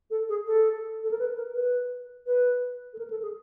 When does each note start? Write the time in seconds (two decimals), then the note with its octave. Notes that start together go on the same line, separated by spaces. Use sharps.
0.10 A4
0.29 G#4
0.47 A4
1.03 A4
1.11 A#4
1.19 B4
1.36 A#4
1.54 B4
2.26 B4
2.93 A4
2.98 A#4
3.10 A4
3.22 G#4